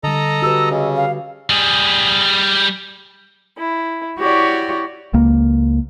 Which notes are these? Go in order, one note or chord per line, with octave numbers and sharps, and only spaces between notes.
D3 G3 A4 D#5 A#5
F#4 G4 B4 E6
C#3 D#5
F5
G3 G#4
E4
E4 F#4 G4 C#5 D5
C#2 A#3